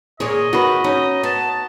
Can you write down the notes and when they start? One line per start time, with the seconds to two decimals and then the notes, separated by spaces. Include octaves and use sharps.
0.20 A#2 G#4 C#5 D#5
0.53 D#3 F#4 B4
0.84 C#4 D#4
1.23 B3 A5